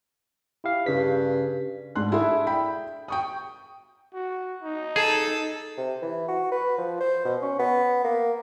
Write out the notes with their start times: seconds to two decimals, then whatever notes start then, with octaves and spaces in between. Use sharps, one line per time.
0.64 E4 G4 F5
0.86 G2 C#3 B6
1.96 G#2 D4 C6 F#6
2.11 D4 E4 G#4 A4 E5
2.47 E5 G5 B5
3.08 G5 C#6 D#6
4.14 F#4
4.63 D#4
4.96 G#4 A4
5.78 C3
6.02 E3
6.28 F#4
6.52 B4
6.78 F3
7.01 C5
7.25 B2
7.42 C#4
7.59 B3
8.05 A#3